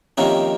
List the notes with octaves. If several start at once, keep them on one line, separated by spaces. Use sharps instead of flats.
F2 C3 D#3 A#3 C#4